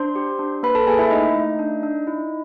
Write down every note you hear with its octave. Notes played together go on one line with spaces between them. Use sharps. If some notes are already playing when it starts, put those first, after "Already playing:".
Already playing: D4 C5 C6
G4
D4
A#3 B4 B5
A4 A5
A#3 G#4 G#5
E4 E5
A3 D#4 D#5
A3
D4
D4
E4